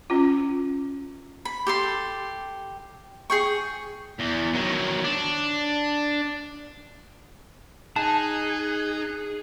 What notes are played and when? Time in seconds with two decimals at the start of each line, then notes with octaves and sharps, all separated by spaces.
0.10 C#4 F4
1.45 B5
1.67 G4 A4 C6
3.30 G#4 G5 C#6
4.19 E2
4.54 D#3 F#3
5.05 D4
7.96 D#4 G#4 A5 F#6